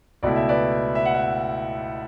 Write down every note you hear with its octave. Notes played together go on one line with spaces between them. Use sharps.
C#2 B2 A3 E4 D5
E5
B4 D5
E5
F#5
E5